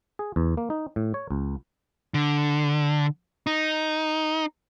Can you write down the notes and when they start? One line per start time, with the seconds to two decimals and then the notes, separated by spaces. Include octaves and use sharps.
0.19 G#4
0.36 E2
0.57 A#3
0.70 D#4
0.96 A2
1.14 C#5
1.31 C#2
2.14 D3
3.47 D#4